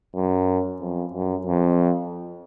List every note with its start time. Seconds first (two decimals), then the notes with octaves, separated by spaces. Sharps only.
0.15 F#2
0.81 F2
1.13 F#2
1.46 F2